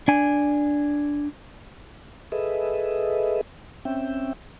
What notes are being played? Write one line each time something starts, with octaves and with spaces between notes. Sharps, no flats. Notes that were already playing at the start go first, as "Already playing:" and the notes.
D4 G#5
G#4 A4 B4 D#5 E5
C4 C#4 E5 G5